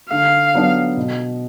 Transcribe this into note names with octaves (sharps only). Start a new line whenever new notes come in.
D3 F5
F#3 B3 D4
B2